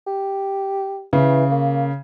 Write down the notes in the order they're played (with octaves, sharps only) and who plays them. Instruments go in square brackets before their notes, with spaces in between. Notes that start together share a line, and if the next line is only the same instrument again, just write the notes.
[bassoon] G4
[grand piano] C#3 [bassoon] E3
[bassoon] A#3